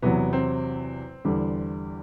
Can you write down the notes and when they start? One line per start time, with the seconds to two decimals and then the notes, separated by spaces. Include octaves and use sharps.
0.02 E2 C3 F#3 B3
0.33 C4
1.25 E2 D3 G3